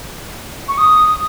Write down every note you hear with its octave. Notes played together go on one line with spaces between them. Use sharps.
C#6
D#6